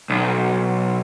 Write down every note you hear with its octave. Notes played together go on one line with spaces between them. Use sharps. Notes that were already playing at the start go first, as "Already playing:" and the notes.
B1